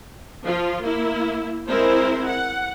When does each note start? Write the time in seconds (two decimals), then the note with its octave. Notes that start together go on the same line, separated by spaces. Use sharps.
0.45 F3 F4
0.82 A#3 E4
1.66 G#3 C4 E4 A#4 C5
2.25 F#5